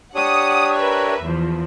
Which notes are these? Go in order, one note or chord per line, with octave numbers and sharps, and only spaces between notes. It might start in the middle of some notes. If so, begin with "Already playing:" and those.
D4 G4 C#5 F#5 D#6
A#4 B4 E5
E2 F3